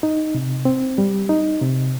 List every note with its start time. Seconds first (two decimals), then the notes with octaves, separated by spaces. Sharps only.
0.03 D#4
0.35 C3
0.65 C4
0.98 G3
1.29 D#4
1.61 C3